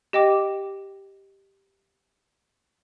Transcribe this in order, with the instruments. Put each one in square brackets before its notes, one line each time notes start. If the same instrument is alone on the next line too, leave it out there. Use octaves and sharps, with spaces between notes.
[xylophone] G4 D#5 G5 D6